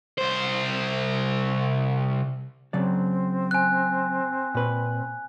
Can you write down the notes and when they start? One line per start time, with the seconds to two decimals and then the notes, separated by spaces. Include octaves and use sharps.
0.18 C2 C5
2.73 C#3 F#3 C4 D5
3.51 G#5 F#6
4.55 A#2 B4